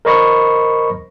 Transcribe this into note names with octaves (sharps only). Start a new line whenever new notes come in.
A#4 C5 D#5 B5 C#6 A#6